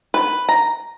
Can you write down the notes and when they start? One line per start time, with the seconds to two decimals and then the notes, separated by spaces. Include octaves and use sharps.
0.14 B4
0.49 A#5